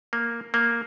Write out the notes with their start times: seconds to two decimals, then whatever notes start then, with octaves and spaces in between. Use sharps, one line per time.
0.13 A#3
0.54 A#3